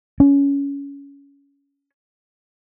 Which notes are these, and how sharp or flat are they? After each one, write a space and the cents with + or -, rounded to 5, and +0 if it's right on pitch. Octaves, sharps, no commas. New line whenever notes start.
C#4 +20